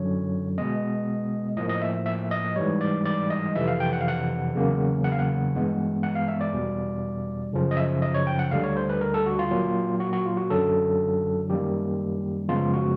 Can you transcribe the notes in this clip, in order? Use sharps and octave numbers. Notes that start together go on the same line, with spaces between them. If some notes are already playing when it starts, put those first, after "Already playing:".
Already playing: F#2 D3 F#3 C#5
B2 G#3 B3 D#5
A2 F3 A#3 D#5
D#5
E5
E5
D#5
G#2 E3 G3 C#5
D5
D5
D#5
F2 C3 E3 E5
F5
G5
F#5
F5
F#5
E2 C#3 F#3 A#3
F#5
F5
F#5
G2 E3 G#3 B3
F#5
F5
E5
D5
E2 B2 G3
F#2 C#3 F3
D#5
E5
D#5
C#5
G5
F#5
D2 D3 G3 F5
C#5
C5
B4
A#4
A4
F#4
F4
A#2 F#3 A#3
F#4
F#4
F4
F#4
F#2 D3 F#3 A4
F#2 D#3 G3 A#3 G4
F#2 C#3 F3 G#3 B3 F4
F#4